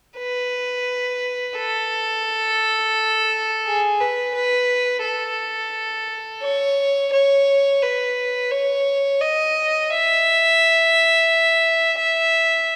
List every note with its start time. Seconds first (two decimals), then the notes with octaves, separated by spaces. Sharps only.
0.18 B4
1.57 A4
3.66 G#4
4.00 B4
4.35 B4
5.04 A4
6.43 C#5
7.13 C#5
7.82 B4
8.51 C#5
9.21 D#5
9.90 E5
11.98 E5